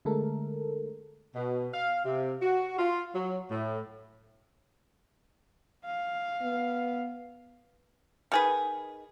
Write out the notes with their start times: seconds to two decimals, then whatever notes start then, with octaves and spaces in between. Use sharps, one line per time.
0.05 D3 G#3 A3 A4 A#4
1.35 B2
1.73 F5
2.05 C3
2.42 F#4
2.79 F4
3.14 F#3
3.50 A2
5.85 F5
6.42 B3
8.32 D#3 G#4 B4